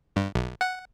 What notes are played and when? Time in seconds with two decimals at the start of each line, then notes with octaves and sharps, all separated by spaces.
0.16 G2
0.35 B1
0.61 F#5